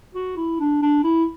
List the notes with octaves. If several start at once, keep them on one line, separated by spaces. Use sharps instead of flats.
F#4
E4
D4
D4
E4